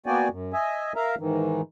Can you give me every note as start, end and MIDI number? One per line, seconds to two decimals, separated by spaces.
0.06 0.29 58
0.06 0.29 59
0.06 0.29 66
0.06 0.29 74
0.06 0.29 79
0.06 0.29 80
0.31 0.53 42
0.53 0.93 75
0.53 0.93 76
0.53 0.93 80
0.96 1.15 70
0.96 1.15 76
0.96 1.15 77
0.96 1.15 82
1.19 1.61 44
1.19 1.61 51
1.19 1.61 52